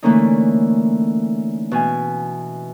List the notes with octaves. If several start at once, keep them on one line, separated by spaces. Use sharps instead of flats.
D3 E3 A3 A#3 C#4 D#4
B2 E3 G#5